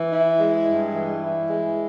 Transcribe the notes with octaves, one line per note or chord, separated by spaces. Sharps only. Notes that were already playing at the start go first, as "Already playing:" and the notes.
Already playing: E3
E4
G#3
G2
E3
E4
G#3